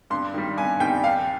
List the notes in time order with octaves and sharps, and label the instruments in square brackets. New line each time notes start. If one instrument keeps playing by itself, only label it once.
[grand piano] G2 [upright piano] C6
[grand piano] D#3 G3
[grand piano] G2 [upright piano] G#5
[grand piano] D#3 G3 [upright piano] G5
[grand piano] D#2 [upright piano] F5